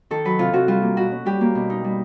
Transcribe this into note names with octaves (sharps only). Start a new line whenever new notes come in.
D#3 A4
F#3 B4
C3 F4
C3 F#4
G3 F4
A#3
B2 F#4
C#4
G3 G4
A#3
B2
D#4
G3